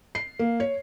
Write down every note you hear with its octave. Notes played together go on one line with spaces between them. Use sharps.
C7
A#3
C#5